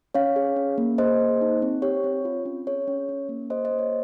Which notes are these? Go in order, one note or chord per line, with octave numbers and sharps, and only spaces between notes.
C#4 C#5 F5
G#4
C#4
A#3
G#4 C5 D#5
A#3
D#4
C4
G4 C#5
C4
F4
C#4
G#4 C#5
C#4
C#4
A#3
G#4 C5 D#5
C5 D#5
A#3
C#5